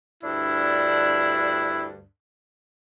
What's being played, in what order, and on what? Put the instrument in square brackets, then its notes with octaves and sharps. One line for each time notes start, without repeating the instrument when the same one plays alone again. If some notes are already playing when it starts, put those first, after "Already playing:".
[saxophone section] D2 G2 D4 [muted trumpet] E4